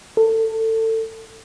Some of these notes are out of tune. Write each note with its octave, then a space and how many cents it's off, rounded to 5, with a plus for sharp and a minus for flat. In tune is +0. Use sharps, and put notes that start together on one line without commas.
A4 +25